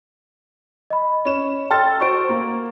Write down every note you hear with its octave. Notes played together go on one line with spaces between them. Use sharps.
D#5 B5
C#4 E7
A4 G5 C6 F6 A6
F#4 C5 C#6 D7
A#3